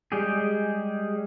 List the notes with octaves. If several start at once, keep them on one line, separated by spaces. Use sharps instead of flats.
G3 G#3 G4 G#4